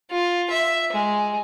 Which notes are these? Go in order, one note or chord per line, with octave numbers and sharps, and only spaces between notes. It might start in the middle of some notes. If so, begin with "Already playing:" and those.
F4
E5
G#3